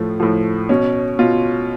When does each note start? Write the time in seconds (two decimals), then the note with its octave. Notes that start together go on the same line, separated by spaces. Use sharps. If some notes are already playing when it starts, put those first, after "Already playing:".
Already playing: A2 F3 A3
0.20 A2 F3
0.69 B2 C#4
1.19 B2 F4